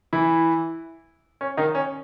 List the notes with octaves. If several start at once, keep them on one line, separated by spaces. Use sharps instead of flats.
E3 E4
C#4
D#3 D#4
C#4